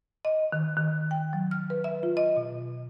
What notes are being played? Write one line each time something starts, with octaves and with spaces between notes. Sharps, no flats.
D#5
D#3
D#3
G5
F#3
F6
B4
E5
F4
D#5
B2